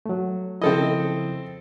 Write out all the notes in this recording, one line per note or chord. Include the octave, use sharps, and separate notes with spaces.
F#3 A3
C#3 F3 C4 E4 A4 D#5